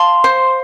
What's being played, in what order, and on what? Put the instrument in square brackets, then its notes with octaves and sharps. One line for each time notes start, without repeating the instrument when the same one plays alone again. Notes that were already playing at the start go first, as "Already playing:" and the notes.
Already playing: [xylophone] F5 [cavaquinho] A5 C6
[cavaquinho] C5